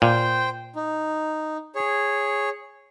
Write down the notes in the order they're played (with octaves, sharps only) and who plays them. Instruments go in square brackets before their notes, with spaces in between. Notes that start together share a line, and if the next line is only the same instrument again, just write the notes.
[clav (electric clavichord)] A#2 [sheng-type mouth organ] C5 G5
[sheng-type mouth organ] D#4
G#4 C#5